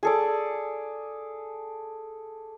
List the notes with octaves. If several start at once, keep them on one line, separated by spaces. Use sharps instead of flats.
G#4 A4 D5